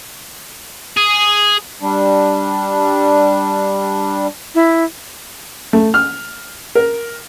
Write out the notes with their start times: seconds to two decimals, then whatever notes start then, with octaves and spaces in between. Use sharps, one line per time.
0.97 G#4
1.82 G3 D4
4.55 E4
5.73 A3
5.94 F6
6.75 A#4